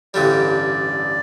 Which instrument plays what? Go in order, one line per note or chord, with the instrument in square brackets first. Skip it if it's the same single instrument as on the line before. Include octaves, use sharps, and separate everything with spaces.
[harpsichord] A1 G2 D3 G3 [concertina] D5